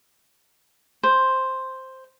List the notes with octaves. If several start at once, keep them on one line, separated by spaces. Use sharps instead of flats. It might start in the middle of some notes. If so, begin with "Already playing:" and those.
C5